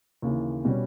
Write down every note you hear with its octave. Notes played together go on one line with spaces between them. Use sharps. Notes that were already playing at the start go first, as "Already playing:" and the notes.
D#2 C#3 E3
B2 G3 C#4